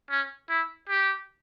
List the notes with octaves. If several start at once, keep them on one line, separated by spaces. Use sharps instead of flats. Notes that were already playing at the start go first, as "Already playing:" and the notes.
C#4
E4
G4